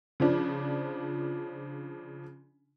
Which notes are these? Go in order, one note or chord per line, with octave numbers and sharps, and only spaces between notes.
C#3 F3 D4